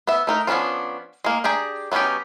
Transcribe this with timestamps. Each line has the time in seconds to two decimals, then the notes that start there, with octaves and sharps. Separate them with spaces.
0.07 B3 E5
0.27 A3 D#4 A#4
0.47 F3 B3 C#4 D4 F4
1.24 G#3 A#3
1.44 D4 G4 G#4 A#5
1.92 F#3 B3 C#4 D#4 G4